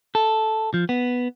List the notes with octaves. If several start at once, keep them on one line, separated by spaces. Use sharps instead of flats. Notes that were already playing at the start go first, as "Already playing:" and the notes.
A4
F3
B3